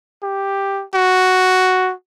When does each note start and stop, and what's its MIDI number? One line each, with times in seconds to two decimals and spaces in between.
0.23 0.84 67
0.95 1.93 66